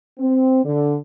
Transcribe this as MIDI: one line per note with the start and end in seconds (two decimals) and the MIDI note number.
0.19 0.60 60
0.64 0.96 50